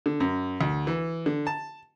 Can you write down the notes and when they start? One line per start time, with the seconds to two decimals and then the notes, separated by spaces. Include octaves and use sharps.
0.06 D3
0.20 F#2
0.61 D2
0.87 E3
1.26 D3
1.47 A5